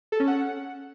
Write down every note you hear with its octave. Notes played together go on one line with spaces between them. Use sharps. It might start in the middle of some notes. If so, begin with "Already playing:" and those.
A4
C#4
F#5